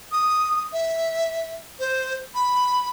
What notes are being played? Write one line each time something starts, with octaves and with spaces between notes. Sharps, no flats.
D#6
E5
C5
B5